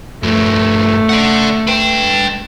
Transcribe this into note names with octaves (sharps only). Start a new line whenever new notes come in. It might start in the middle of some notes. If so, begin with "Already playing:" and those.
G2 F3 A3
D5 F#5
B4 G5